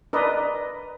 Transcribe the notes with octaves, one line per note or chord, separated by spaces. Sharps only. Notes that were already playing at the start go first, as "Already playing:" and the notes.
D4 A#4 B4 D5 D#5